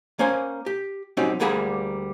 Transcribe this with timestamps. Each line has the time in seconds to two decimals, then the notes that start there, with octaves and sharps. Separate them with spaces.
0.19 A#3 C#4 C5 G#5
0.66 G4
1.17 F#3 C4 C#4 D#4 G4
1.40 D2 G3 A#3 G#4 F#5 B5